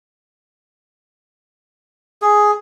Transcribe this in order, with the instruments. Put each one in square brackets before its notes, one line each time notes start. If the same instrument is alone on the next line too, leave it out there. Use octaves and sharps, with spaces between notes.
[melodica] G#4